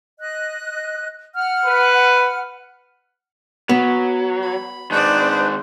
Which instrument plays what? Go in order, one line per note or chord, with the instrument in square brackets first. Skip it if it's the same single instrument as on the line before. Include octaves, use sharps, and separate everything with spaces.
[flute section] D#5 F#6
F#5 F6
[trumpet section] B4
[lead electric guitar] F#3 [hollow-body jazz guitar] B3
[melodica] B5
[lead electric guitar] D#3 G#3 [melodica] D4 D#4 B4 [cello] C5 D5